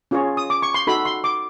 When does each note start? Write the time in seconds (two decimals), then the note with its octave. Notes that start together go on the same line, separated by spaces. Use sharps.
0.11 C#4 F4 G#4 C#5
0.37 D#6
0.50 D6
0.62 C#6
0.74 C6
0.87 D#4 F#4 A4 B5
1.05 C6
1.24 D6